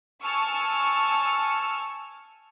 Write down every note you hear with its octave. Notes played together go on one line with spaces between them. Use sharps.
G#5 A5 C#6 E6 F6 C#7